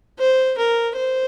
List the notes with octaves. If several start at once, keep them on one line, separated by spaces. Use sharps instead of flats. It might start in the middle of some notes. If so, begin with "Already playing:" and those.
C5
A#4
C5